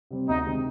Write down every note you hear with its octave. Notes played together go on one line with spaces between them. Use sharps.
C3 G3 C4
D2 D#4
C3 D#3 G#3